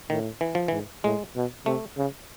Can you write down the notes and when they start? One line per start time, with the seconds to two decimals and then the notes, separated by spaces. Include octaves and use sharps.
0.10 A2 D#3
0.41 E3
0.55 F3
0.68 G#2 E3
1.04 A2 G#3
1.36 B2
1.66 C3 A3
1.97 C#3